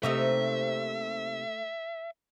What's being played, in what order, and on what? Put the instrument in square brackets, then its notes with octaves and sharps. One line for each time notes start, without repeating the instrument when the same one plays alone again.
[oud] C3 A#3 D#4 [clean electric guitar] A3 [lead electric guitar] E5